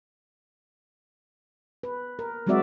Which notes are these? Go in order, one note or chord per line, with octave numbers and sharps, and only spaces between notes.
B4
A#4
F#3 G#3 C4 F#4 D5 E5